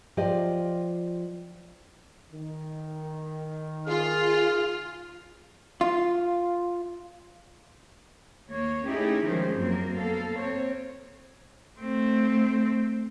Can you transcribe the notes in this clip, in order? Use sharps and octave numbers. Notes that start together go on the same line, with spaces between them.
F3 F4 G4 D5 D#5
D#3
F4 G#4 F6
F4
D#2 A#3 C#5
A3 C#4 D#4 E4 G4 G#4
D#3 F3 G#3 C#4 G4 C5
F#2 A#3 C4 A#4
A#3 B3 A4 F5
C4 C5 C#5
A3 C4